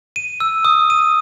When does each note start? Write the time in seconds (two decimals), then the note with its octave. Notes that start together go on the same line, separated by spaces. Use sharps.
0.16 D#7
0.40 E6
0.65 D#6
0.90 D#7